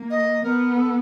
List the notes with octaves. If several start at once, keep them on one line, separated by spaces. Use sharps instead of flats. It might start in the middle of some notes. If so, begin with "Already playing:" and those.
Already playing: A#3
D#5
B3 A#4
A4